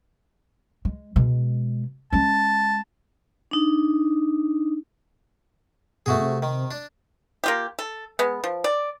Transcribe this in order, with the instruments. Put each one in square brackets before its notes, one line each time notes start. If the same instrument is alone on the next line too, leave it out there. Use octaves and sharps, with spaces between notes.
[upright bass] G#3
B2 G#3
[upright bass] G#3 C#4 [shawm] A5
[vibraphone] D4 D#4
[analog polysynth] G2 B2 [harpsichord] A3 F#4 G#4
[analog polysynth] C3
[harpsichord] D#3
D4
[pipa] A#3 F4 G4
A4
G#3 B3
F3
D5